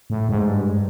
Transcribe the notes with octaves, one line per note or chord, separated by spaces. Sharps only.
A2
G#2
G2